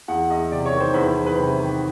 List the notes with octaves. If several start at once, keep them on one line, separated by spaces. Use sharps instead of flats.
E2 F#5
E2 D#5
C3 D5
C#5
D#3
C5
E2 B4
E2
B4
C3 C5
D#3